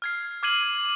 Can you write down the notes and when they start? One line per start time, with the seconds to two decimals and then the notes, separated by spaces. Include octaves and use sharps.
0.02 F6 G#6 C7
0.43 D6 F6 G#6 C7 D#7 F#7